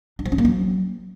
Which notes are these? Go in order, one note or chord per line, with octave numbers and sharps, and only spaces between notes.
D4
F3
C#4
A#3
F#3